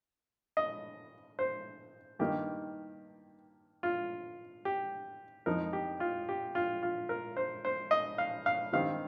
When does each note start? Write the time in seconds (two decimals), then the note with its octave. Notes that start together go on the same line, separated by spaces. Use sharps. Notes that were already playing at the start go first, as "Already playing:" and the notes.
0.57 D#5
1.39 C5
2.19 G2 D#3 A#3 D#4 G4
3.83 F4
4.65 G4
5.46 F2 F3 D#4 A#4
5.73 G4
6.00 F4
6.29 G4
6.55 F4
6.83 F4
7.09 A#4
7.37 C5
7.65 C5
7.91 D#5
8.18 F5
8.46 F5
8.73 G2 D#3 G3 C4 D#4 F5